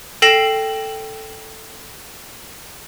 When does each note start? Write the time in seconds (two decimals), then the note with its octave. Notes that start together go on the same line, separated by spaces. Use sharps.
0.22 A4 G5 A#6 C7 E7 F#7